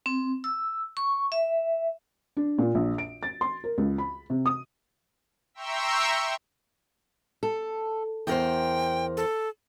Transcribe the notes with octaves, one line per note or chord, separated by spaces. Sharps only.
C4
E6
C#6
E5
D4
A#2
A#1
D7
A6
C6
A#4
C#2
B5
C3
D#6
E5 G5 A#5 C6 C#6 E6
A4
E2 A#4 C5 G5
A4